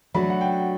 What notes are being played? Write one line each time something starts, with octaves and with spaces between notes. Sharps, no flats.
F#3 A3 D4 F#4 B5
F#5
G5